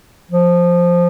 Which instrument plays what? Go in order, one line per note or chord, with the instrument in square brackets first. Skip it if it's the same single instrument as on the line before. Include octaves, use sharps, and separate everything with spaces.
[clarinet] F3